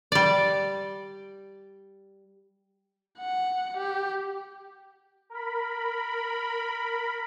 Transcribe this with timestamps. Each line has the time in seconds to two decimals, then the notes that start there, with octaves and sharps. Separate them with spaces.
0.12 G3 D5
3.18 F#5
3.77 G4
5.30 A#4 B5